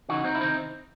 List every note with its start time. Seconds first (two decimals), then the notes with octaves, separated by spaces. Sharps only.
0.09 C#3 E3 D#4 F#4
0.24 C4 D#4
0.35 E4
0.41 C3 D#3 C4 D#4